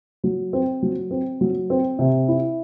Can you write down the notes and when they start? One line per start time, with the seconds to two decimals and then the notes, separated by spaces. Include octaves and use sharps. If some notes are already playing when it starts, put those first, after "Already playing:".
0.24 F#3
0.53 C4
0.82 F#3
1.11 C4
1.41 F#3
1.70 C4
1.99 C3
2.28 E4